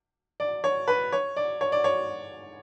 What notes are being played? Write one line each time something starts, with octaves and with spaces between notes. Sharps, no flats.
D5
C#5
B4
C#5
D5
C#5
D5
C#5